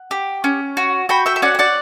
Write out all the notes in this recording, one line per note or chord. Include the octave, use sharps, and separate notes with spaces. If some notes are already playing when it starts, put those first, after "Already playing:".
Already playing: F#5
G4
C#4
F#4
F#4 G5 B5
E5 G5
E5
C#4 D5 F#5
G5
D5 F#5